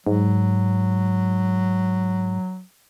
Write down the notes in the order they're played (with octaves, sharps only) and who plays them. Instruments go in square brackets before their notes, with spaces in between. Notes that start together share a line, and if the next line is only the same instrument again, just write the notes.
[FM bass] G#2 [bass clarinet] F#3